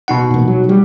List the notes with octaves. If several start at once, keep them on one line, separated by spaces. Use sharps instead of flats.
B2 D#4 F#5
E1 A#2
F#3
G3